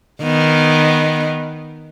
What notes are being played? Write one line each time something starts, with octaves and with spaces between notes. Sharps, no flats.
D#3 B3